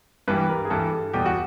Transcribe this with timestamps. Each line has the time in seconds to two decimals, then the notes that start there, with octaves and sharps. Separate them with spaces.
0.28 G2 E3 G3 B4
0.49 A#4
0.65 G#4
0.70 G2 E3 G3 A4
1.13 E2 B2 G3 G4
1.26 F#4